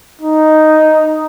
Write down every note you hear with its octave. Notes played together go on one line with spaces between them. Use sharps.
D#4